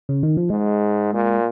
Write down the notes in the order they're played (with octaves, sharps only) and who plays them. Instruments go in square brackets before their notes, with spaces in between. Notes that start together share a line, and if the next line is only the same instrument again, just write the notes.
[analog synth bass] C#3
D#3
F3
[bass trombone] G#2 [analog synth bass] G#3
[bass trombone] A#2